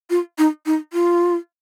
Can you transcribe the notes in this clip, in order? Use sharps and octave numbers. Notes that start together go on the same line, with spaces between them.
F4
D#4
D#4
F4